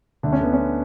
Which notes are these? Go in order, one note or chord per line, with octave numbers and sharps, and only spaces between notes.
D2 D4
C#4
D3 B3
C#4